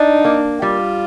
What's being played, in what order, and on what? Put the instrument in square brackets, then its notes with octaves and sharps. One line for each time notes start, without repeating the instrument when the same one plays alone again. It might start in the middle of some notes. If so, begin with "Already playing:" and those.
Already playing: [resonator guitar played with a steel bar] D4 [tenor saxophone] D#4
[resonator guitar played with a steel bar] A#3
[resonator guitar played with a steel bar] G3 [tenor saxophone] F4